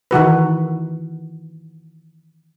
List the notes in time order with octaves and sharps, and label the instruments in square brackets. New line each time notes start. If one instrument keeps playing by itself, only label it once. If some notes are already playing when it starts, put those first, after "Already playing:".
[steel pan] D#3 E3 F#4 B4